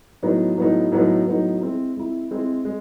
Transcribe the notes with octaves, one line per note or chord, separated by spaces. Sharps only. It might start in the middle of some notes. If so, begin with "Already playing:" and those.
A2 F#3 B3 D#4
A2 F#3 B3 D#4
A2 F#3 B3 D#4
A2 F#3 B3 D#4
G#3 C4 E4
G#3 C4 E4
G#3 C4 E4
G#3